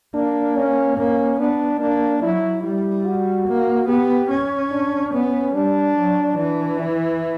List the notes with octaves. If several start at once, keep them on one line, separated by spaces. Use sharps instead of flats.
A#3 D4
C#4
A#3 C#4
B3 D4
A#3 D4
F#3 E4
G3 E4
F#4
A#3
B3 G4
C#4
D4
B3 C#4
G3 D4
F#3
E3 D4
E4